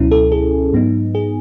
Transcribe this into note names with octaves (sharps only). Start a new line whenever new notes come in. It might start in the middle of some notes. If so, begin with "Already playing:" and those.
Already playing: C#2 B2 F#3 C#4 E4
A4
G#4
G#2 F#3 B3 D#4
G#4